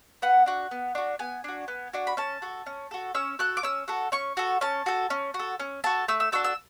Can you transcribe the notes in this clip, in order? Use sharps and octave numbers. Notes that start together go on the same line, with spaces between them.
B3 F#5
D4 F#4
B3
D4 F#4
B3 G#5
D4 F#4
B3
D4 F#4
B5
C#4 A5
F#4 A4
C#4
F#4 A4
C#4 E6
F#4 A4 F#6
D6
C#4 E6
F#4 A4
C#4 C#6
F#4 A4
C#4 A5
F#4 A4
C#4
F#4
A4
C#4
F#4 A4 A5
A3 E6
E6
D4 F#4 A4 E6
E6